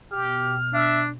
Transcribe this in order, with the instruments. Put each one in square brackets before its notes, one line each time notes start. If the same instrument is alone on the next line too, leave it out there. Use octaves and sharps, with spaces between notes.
[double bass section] B2 [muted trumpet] G4 [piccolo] F6
[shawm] D4 [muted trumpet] E5